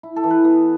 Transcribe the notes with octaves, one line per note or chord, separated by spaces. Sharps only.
E4
A4
E3
B4
B3